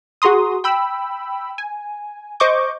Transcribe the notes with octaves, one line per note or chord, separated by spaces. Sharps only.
F#4 G#4 A#5 C6 D#6
G5 B5 E6
G#5
C5 D#5 C#6 D6 G6